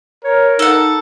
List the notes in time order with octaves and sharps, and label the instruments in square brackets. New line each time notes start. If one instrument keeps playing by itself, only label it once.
[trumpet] A#4 [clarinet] C#5
[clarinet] D#4 [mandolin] A4 F#5